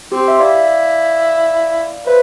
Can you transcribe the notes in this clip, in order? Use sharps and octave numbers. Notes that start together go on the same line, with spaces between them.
C4 G4
E5
E4 D5 F5
B4 C5 E5